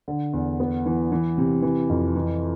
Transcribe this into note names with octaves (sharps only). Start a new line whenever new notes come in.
D3
E2
B3
E3
E3
C3
E3
F2
E3